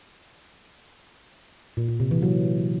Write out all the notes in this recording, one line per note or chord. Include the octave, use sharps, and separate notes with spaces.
A#2
A#2
C3
E3
F#3